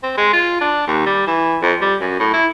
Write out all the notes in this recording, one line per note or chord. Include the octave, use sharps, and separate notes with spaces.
C4
G#3
F4
D4
D#2
G3
E3
F2
G3
F#2
A2
E4